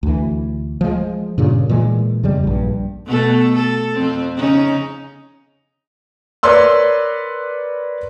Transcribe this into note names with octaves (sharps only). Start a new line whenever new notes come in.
D2 E3
F3 G#3
G2 A#2 C#3
A#2 E3 G#3
F2 C#3 G3 G#3
A#1 G2
B2 A3 A4
A4
F2 C4
C#3 C#4 D#4
A#4 B4 C#5 D5 C6 E6